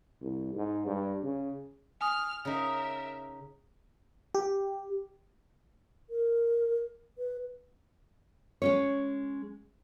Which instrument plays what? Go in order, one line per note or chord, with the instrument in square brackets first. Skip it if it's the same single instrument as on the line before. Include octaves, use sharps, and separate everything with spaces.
[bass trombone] C2
G#2
G2
C#3
[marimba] G#5 D#6 [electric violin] F6
[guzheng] C#3 D#4 [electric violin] A#4 E5
[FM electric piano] G4
[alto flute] A#4
B4
[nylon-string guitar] G#3 C#4 C#5